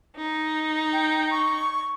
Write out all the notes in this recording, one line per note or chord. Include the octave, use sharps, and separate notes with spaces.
D#4
G5
C#6